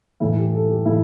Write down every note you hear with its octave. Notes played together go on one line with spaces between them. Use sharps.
A2 E3 E4
G4
A4
G4
A2 E3 E4